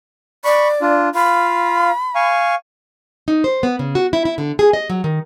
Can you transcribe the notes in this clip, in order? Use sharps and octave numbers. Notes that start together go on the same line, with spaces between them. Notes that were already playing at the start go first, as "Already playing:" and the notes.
D5 B5 C#6
D4 F4
F4 F5 B5
F5 G#5 C#6
D#4
C5
B3
C#3
F#4
E4
E4
D3
G#4
D#5
F#3
D#3